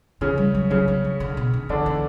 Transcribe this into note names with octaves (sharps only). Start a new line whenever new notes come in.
C#3 E3 C#4
G3
F#3
C#3 F#3 C#4
F#3
F#3
D3
B2
D3
D3 E3 D4
E3